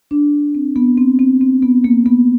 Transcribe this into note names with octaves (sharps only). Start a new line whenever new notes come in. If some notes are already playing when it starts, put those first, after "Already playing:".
D4
C4
B3
C4
C4
C4
B3
A#3
B3